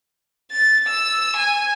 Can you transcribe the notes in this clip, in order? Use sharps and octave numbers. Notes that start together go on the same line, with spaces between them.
A6
E6
G#5